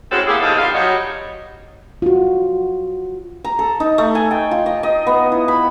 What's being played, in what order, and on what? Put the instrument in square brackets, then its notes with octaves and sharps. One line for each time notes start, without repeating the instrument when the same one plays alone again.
[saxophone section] A2 G#3 C4 C#4 F#4 A4
A#3 B3 E4 G4 G#4
F2 C3 A#3 D#4 A4
D3 G3 F4 F5
F#3 G3 D#4 F#4 C#5 D#5
[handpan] F4 F#4
[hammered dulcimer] A#5
A4
D#4
A3
G#5
G5
F4
D#5
D#5
B3
E4
B5